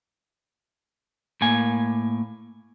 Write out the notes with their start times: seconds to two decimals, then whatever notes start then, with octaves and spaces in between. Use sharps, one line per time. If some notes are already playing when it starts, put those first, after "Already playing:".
1.41 A2 A#3 G#5